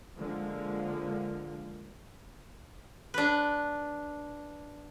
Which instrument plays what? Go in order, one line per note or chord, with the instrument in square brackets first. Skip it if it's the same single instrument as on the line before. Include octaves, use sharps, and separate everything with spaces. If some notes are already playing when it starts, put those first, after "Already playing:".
[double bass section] D3 F3 G#3 A#3
[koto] D4 B4